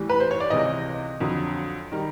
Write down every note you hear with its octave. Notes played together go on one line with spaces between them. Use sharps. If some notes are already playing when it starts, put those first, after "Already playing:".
Already playing: A2 E3 G3
B4
C5
C#5
D5
C#2 C3 E3 D#5
F2 D3 F#3
D#3 G3